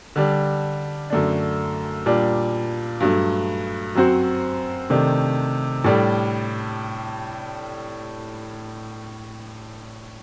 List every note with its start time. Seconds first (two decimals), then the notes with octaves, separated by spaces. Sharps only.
0.16 D3 G3 D4
1.10 F#2 D3 A3 D4
2.06 A#2 G3 D4
3.00 G2 F#3 A3
3.95 F#2 F#3 C4 F#4 C5
4.90 C3 D#3 A3 D4
5.84 A2 G3 D4 A4